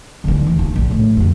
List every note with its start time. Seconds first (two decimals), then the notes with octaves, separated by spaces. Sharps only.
0.24 D3 E3
0.47 D#2
0.59 F4
0.76 A#1
0.91 A2
1.17 G1 F2